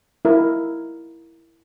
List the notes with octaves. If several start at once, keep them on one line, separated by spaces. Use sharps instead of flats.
E4 A#4